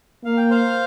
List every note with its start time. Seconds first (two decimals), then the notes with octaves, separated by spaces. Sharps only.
0.24 A#3 F5
0.37 G5
0.51 C5 F5